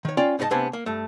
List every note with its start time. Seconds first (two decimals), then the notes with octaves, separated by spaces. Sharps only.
0.05 D#3 C#5
0.17 C#4 F4 D5 F5 G5 C6
0.39 G#2 D#4 F4 C5 D#5 A5
0.51 C3 A3 B3 D4 C5 G#5
0.73 A#3
0.86 G2 A3